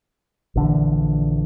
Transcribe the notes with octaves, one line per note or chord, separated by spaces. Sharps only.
A#1 D3 E3